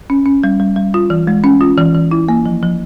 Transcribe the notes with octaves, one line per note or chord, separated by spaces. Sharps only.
C#4
C#4
G3
G3
G3
F4
E3
G#3
C#4
F4
E3
E3
E4
A#3
F3
F3